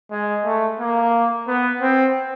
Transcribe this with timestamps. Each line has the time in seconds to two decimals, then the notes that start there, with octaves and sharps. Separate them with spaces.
0.10 G#3
0.45 A3
0.79 A#3
1.47 B3
1.81 C4